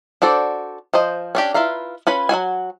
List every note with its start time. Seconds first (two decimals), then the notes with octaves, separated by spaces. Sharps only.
0.22 D4 F#4 A4 C5 D5
0.93 F3 C5 D#5
1.35 C#4 D4 G4
1.54 E4 F4 B4 F5 A#5
2.07 C#4 F4 B4 G#5 B5
2.29 F#3 F4 F#4 G#5